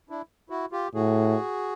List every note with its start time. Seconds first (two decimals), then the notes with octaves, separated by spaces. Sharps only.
0.10 D4 E4
0.50 E4 F#4
0.72 F4 G4
0.94 A2 F#4 G#4